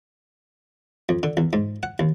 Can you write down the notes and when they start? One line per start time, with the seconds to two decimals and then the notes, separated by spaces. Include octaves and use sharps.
1.09 F2
1.23 D3
1.37 E2
1.53 G#2
1.83 F#5
1.99 D#2